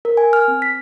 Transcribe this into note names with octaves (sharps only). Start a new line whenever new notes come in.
A#4
G#5
F6
C4
B6